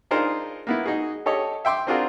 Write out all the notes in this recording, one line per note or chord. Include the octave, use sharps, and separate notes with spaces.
D4 D#4 F4 G#4 A#4 C5
A#3 B3 E4
D#4 F#4 G#4
G4 A4 C#5 D#5
E5 G5 C6 D6
C4 D4 F4 F#4 G#4 A#4